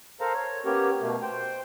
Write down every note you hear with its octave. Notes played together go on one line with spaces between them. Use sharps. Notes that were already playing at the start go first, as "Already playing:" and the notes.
A4 A#4 C5 F5 A#5
C#5
A#3 B3 C#4 G4 A#4 C#5
B2 A3 A#3
C5 G5